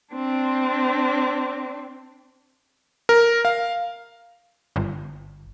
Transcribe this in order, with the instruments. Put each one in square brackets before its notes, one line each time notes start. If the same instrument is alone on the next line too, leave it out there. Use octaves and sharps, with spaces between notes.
[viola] C4 D4
[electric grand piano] A#4
F5
[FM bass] G1